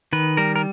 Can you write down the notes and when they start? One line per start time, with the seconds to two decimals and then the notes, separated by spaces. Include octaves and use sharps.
0.13 D#3 B4
0.37 G3 A#4
0.56 A#4